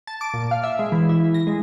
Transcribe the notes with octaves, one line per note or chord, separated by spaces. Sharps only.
A5
D6
A#2
F5
E5
G#3
E3
E4
A#6
G#3